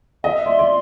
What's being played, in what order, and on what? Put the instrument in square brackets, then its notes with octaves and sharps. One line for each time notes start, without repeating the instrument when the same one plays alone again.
[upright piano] D#5 [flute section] E5
[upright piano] D5 [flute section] C6
[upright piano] D5